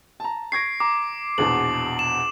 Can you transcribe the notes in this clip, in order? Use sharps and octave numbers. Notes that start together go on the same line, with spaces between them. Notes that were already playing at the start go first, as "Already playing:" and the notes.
A5 A#5
C#6 G#6 A#6 C7 D7
A#5 D6
A#1 E2 B2 F#7
E7